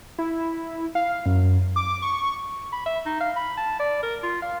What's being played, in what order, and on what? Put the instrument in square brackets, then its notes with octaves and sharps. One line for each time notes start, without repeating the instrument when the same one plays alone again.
[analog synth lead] E4
F5
F#2
D6
C#6
[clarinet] B5
E5
D#4
F5
B5
A5
D5
A#4
F4
F5